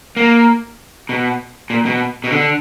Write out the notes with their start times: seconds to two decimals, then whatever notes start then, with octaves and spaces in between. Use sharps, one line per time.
0.17 A#3
1.09 B2
1.70 A#2
1.86 B2
2.24 B2
2.31 D3